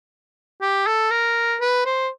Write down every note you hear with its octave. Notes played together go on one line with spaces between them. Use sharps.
G4
A4
A#4
B4
C5